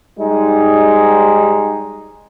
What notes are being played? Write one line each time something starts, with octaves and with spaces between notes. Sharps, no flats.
G#2 G3 G#3 D#4